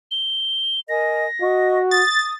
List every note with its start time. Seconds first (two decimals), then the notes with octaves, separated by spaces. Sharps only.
0.11 G7
0.89 A#4 D#5 G#5 A#6
1.42 F#4 D#5 C#6
1.91 D#6 A6